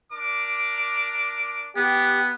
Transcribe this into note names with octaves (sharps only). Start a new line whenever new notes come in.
D4 A#4 D6
B3 G4